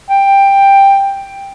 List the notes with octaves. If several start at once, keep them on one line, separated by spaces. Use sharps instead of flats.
G5